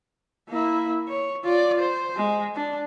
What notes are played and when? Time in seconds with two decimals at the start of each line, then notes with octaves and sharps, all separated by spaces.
0.50 A#3 E4
1.08 C#5
1.44 F4 D5
1.79 C5
2.17 G#3
2.55 D4